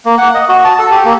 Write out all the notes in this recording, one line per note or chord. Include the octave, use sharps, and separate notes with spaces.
A#3
F#5
D#5
F#4
A5
A4
G4
A#3